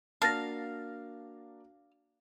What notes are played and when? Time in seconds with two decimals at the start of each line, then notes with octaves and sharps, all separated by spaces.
0.22 A#3 D4 F#4 F5 A5 A6 A#6